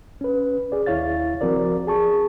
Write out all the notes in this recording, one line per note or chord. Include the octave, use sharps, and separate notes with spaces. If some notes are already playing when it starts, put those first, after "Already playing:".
C#4 B4
G#4 D5
D#2 E4 C#5 F5 A6
C#2 F3 C4 F#4 A#4 D5
G#4 A5 C#6